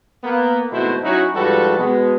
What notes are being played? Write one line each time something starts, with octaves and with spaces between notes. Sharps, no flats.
A#3 B3
G#1 B2 A3 E4 C5
F#3 C#4 D#4 E4 F#4
G#2 F3 G3 F#4 A4 B4
B2 G#3 B3